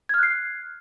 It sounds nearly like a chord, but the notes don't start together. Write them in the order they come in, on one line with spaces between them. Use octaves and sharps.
G#6 F6 F#6 C7